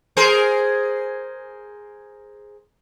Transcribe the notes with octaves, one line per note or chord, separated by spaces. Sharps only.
G#4 A#4 C5